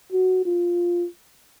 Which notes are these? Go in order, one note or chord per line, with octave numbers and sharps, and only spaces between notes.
F#4
F4